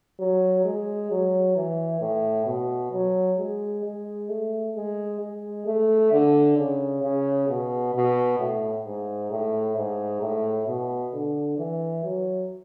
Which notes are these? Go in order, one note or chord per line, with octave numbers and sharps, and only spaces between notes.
F#3
G#3
F#3
E3
A2
B2
F#3
G#3
G#3
A3
G#3
G#3
A3
D3
C#3
C#3
B2
B2
A2
G#2
A2
G#2
A2
B2
D3
E3
F#3